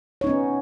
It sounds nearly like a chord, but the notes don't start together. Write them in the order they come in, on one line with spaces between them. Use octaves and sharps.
C#5 D#4 C#4 B3